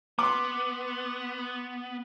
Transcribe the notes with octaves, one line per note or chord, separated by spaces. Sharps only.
B3 C6 D6